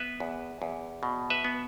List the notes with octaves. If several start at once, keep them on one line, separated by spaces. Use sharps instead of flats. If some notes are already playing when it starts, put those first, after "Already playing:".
Already playing: B3 B4 E5
E2
E2
B2
B4 E5
B3